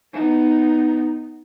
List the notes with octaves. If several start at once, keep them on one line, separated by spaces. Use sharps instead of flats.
B3 D#4